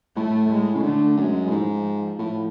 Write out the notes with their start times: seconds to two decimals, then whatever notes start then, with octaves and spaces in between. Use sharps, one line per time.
0.16 A2 A3
0.50 G#3
0.76 C#3
0.83 D3 A3
1.17 F#2 G#3
1.47 A2
1.51 G#2 F3
2.19 A2